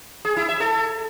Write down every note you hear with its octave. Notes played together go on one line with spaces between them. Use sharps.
G#4
E4
E5
A4